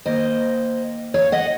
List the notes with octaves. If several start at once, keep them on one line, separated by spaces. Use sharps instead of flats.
D#3 A#3 C5 D#5
C#5 F5
D#5 F#5